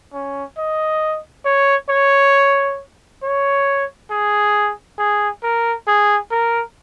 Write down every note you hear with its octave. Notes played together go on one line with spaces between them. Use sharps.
C#4
D#5
C#5
C#5
C#5
G#4
G#4
A#4
G#4
A#4